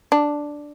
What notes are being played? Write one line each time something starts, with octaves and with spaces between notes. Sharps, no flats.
D4